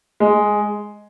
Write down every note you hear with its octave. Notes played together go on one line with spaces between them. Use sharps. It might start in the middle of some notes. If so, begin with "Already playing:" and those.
G#3